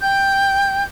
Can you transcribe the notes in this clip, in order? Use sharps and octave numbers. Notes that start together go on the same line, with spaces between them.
G5 G6